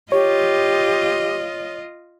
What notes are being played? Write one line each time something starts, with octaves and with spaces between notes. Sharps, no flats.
F4 G4 C#5 D#5